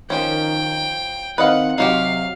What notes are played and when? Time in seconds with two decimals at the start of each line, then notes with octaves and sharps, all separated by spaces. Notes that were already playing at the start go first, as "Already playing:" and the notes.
0.10 D#3 F3 C#4 G5
1.38 D#3 C4 B4 D#5 F5 F#5
1.78 C3 F#3 D#4 F#4 G4 F5